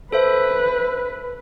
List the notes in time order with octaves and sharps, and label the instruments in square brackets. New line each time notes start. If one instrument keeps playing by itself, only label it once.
[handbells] A4 C5 E5 [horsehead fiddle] B4